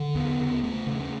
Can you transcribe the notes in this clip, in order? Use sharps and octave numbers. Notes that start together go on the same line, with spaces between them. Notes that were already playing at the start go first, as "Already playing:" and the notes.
Already playing: D3
E2 B3
C#3
E2 A3
C#3
A3